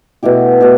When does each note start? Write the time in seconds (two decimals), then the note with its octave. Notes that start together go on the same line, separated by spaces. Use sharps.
0.23 B2 A3 E4 G4
0.61 B2 A3 E4 G4